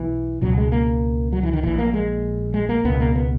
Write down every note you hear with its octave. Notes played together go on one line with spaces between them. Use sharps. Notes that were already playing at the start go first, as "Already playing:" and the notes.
Already playing: B1 B2 E3
C#2 B2 F#3
G#3
A#3
F#3
E3
D#3
A#1 A#2 E3
A#3
G#3
G#3
A#3
C#2 B2 B3
A#3
B3